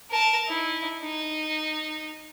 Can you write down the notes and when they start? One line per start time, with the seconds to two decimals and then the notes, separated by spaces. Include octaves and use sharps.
0.10 A#4 A5
0.48 D#4 E4
1.03 D#4